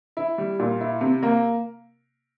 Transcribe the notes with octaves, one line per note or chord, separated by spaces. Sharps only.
E4
G3
A#2
E4
C3
A#3